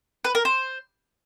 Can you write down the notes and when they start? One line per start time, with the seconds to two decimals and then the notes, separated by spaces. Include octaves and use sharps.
0.24 B4
0.35 A#4
0.45 C5